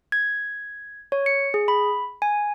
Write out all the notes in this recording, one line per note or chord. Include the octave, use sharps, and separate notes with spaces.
G#6
C#5
C#7
G#4
B5
G#5